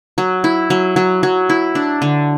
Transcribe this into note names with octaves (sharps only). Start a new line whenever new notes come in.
F#3
E4
F#3
F#3
F#3
E4
D4
D3